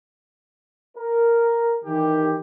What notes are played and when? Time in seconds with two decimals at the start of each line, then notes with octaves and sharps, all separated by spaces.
0.98 A#4
1.85 D#3 E3 G4